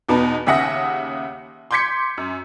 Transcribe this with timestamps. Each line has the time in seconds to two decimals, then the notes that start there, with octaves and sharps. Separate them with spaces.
0.09 E2 B2 D#4 B4 A5
0.47 D#2 C#3 E5 F#5 D#6 A#6
1.71 C6 D6 G6 G#6 B6 C#7
2.18 F#2